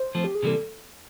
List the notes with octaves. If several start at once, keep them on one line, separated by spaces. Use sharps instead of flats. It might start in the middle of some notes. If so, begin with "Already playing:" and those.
Already playing: C5
F3 A3 C4
G4
G#4
C3 E3 G3 A#3 A4